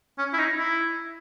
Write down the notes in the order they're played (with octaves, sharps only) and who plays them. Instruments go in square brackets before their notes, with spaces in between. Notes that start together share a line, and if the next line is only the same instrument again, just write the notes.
[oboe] C#4
E4
D#4
E4